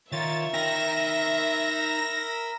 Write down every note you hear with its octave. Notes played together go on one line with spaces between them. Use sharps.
D#3 F4 C#5 E5 A6
D#4 A#4 G5 B5 E6 A#6